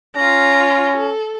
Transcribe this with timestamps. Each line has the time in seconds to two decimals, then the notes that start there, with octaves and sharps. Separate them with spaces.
0.16 C#4 F4 A#5
0.96 A4